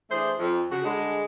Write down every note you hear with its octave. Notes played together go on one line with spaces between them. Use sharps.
E3 A3 D4 G#4 C5
F2
C#3 F#4
D3 G3 G#3